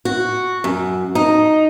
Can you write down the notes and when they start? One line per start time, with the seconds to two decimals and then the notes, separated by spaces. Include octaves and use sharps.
0.05 F#4
0.64 F#2
1.15 D#4